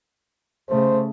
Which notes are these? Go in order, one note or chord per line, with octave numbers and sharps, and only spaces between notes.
C#3 A3 C5